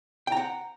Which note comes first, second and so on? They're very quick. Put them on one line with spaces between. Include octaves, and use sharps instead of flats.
G5 A#5 F#5